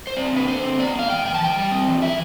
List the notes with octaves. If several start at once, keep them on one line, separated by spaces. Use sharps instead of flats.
C5
C4 D5
D3 B4
D3 C5
C4
B3 D5
D4
F5
E3 G5
E3 G5
A5
E3 G5
G3
C4
E3
E4 E5